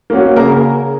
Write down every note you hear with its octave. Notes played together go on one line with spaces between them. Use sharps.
A#3 C#4 F#4
C#3 A#3 A#4